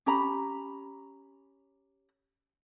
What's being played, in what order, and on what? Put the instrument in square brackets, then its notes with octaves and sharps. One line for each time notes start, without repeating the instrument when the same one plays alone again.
[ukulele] C#4 G4 A#5 B5